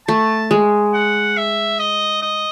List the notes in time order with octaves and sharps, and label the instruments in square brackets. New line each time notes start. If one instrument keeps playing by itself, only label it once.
[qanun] A3 [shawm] A5
[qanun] G#3
[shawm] F#5
E5
D#5
D#5